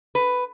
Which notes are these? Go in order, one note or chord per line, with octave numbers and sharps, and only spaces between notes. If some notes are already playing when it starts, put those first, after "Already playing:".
B4